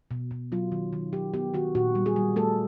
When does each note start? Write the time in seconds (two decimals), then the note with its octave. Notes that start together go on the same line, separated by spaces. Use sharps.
0.11 B2
0.31 B2
0.52 F#3 F4
0.72 D#3
0.93 D#3
1.13 F#3 G4
1.34 B3 G4
1.54 D#3 F#4
1.75 A#2 F#4
1.95 G3
2.06 G#4
2.16 G3
2.36 A3 A4